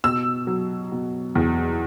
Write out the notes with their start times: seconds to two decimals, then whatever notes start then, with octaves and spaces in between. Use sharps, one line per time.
0.04 B2 E6
0.47 F#3
0.92 B2
1.35 E2